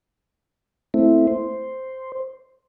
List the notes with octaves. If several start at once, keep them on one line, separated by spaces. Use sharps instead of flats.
A3 C4 E4
C5